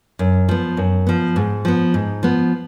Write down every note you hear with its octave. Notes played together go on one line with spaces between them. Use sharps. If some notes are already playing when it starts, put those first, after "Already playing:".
F#2
F3 B3
F#2
F3 B3
G#2
F3 B3
G#2
F3 B3